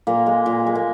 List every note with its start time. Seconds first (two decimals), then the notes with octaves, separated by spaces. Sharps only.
0.07 A#2 A#3
0.26 G#3
0.46 A#2
0.66 G#3
0.75 A#3